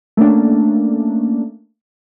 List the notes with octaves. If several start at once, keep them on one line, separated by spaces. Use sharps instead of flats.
A3 A#3 C#4 D4